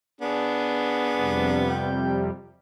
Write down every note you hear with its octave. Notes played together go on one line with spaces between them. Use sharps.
B3 D4 G#4
F2 C3 G3
G5